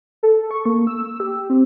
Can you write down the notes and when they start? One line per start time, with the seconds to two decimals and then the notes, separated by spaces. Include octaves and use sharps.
0.23 A4
0.51 C#6
0.66 A#3
0.87 E6
1.20 G4
1.50 C4